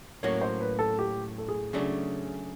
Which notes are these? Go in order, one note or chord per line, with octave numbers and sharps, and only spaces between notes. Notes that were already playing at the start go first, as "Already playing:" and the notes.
A2 F#3 A#3 C#4 F#4 C#5
C5
B4
A4
G4
A4
G#4
C#3 F#3 A3 D4 G#4